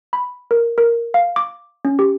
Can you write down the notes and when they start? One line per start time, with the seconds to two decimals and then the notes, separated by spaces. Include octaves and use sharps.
0.13 B5
0.51 A#4
0.78 A#4
1.14 F5
1.36 D6
1.85 C#4
1.99 G4